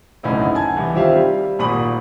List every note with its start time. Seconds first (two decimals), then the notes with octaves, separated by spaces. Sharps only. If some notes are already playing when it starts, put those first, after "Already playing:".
0.23 F#1 D2 A2 D#4 E4 D#5
0.54 F#5 G#5 A5 G#6
0.76 C2 E3
0.94 D#3 G3 C4 F4 E5 F5
1.14 G3
1.59 G#1 A#2 B5 C#6 D#6 F#7